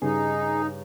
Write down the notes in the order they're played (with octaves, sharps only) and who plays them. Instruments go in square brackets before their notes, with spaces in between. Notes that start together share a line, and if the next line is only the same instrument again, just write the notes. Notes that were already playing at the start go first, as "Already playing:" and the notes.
[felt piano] G2 C#3 [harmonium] D#4 [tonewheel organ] G#4